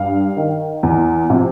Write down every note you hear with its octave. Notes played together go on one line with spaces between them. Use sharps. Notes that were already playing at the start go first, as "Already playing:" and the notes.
Already playing: G2 F5
D#3
E2
C3 F3